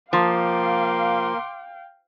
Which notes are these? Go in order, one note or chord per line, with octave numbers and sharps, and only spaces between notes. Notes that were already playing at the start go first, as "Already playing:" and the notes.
F3 A#3 F5 G5 C6 D6